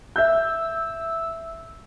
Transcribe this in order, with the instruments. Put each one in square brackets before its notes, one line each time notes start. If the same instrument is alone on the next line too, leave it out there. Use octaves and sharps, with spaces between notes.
[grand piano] E5 G6 [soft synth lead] E6